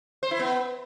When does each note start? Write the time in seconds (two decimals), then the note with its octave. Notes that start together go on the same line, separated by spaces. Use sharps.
0.23 C5
0.31 E4
0.39 B3